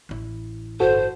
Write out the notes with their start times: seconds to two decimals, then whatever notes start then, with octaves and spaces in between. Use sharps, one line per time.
0.09 A1 E4
0.80 G1 F#4 A4 C5